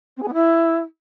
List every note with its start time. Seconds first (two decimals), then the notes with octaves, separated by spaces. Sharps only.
0.17 C4
0.22 G#4
0.28 B3
0.33 E4